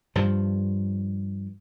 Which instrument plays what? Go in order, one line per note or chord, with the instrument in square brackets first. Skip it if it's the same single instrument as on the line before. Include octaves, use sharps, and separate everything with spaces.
[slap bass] G2 F3